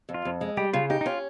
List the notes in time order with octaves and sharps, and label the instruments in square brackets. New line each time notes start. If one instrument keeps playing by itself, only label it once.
[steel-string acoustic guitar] F2
[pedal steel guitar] F4
[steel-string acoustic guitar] F2
G#3
[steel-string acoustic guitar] G3 [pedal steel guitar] G4
[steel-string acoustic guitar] C#3 [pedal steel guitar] F4
[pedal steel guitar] D#4 [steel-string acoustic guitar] G4
[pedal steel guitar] D#4
[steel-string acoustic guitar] C#4 [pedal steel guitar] F4